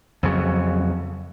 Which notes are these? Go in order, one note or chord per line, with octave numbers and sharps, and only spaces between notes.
F2 C#3 F#3